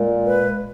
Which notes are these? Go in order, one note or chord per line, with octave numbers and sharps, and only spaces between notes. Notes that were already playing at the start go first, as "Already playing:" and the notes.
Already playing: A#2 G#3
B4